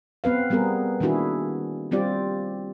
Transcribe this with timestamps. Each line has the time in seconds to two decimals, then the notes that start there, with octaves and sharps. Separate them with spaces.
0.24 B3 C4 B4 F5
0.50 G3 B3 C4 G#4 A#4
1.00 D#3 A#3 D4 E4 F#4 G#4
1.91 G3 C4 F4 G4 D5